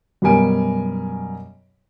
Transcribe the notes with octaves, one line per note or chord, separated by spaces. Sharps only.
F#2 B2 G3 A#4 G#5 D7